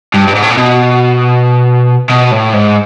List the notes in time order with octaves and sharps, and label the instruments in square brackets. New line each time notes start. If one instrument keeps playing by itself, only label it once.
[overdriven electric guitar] G2
G2
G#2
A2
A#2
B2
B2
A2
G#2